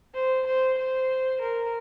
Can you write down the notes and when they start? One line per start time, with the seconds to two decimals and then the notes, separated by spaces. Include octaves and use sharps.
0.14 C5
0.46 C5
0.77 C5
1.41 A#4